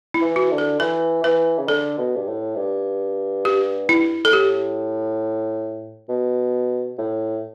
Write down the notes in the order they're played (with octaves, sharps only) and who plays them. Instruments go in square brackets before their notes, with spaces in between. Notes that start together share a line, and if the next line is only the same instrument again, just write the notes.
[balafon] E4
[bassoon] E3
[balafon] F#4
[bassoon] D3
[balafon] A4
[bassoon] E3 [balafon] B4
[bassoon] E3 [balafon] B4
[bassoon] C#3
[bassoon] D3 [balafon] A4
[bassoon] B2
G2
A2
G2
[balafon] G4
E4
A4
[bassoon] A2 [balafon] G4
[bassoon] B2
A2